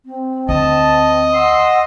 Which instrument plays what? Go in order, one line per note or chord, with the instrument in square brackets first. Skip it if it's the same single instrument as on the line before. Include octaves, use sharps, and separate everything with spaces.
[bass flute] C4
[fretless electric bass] D2 [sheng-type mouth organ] D#5 [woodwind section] A5
[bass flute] F#5 [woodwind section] C6 E6